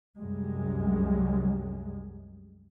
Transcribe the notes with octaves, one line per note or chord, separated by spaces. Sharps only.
C2 F#2 G3 G#3